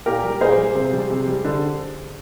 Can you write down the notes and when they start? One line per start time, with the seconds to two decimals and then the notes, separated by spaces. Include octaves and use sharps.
0.06 A#2 G4 A#4
0.24 G3
0.40 A#2 G#4 C5
0.57 G3
0.75 C3
0.93 G3
1.10 C3
1.27 G3
1.45 D3